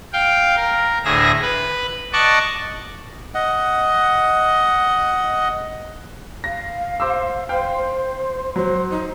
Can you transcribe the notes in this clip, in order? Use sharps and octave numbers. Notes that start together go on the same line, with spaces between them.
F5 G5
A#4
D2 A2 G#4 E5 A#6
B4
D5 D#5 F#5 A5 C#6 D6
D#5 F#5
F5 A#6
C5 D6 E6
C5 F5 G5
F#3 C5
D#4